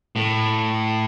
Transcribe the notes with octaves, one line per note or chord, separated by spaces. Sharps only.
A2